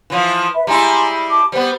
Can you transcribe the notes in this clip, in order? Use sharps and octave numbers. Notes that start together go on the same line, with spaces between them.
E3 F3
B4 E5 B5
G3 G#3 E4 G#5 A#5 C6
A5 D6
G3 B3 C5